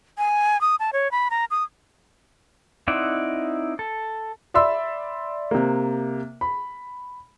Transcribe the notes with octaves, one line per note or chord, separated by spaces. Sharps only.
G#5
D#6
A5
C#5
B5
A#5
D#6
C4 D#4 E4 D5 F#5
A4
D5 E5 B5 C6 E6
C3 A#3
B5